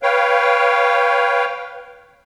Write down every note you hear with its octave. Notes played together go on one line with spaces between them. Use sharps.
B4 C#5 F5 G5